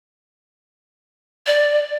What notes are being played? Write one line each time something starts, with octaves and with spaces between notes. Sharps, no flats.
D5